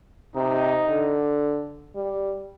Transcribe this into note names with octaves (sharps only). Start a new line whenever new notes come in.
C3 D#4
D3
G3